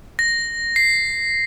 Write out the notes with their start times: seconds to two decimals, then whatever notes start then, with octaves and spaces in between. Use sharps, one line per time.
0.19 A#6
0.76 C7